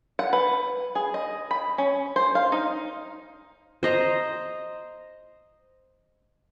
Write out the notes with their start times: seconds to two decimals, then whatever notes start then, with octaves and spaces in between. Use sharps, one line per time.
0.19 F#5
0.33 B4
0.95 G#4
1.14 D#5
1.51 B5
1.78 C#4
2.16 C5
2.35 F5
2.52 D#4
3.83 C5 D#5 A#5